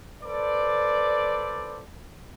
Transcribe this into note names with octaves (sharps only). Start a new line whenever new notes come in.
A4 B4 C5 D5